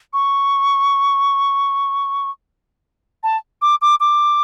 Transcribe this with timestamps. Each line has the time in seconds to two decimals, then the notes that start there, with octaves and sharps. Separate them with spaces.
0.13 C#6
3.23 A5
3.62 D6
3.82 D6
4.00 D6